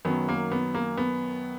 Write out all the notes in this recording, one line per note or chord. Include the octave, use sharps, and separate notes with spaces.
F#2 D#3 F#3 B3
A#3
B3
A#3
B3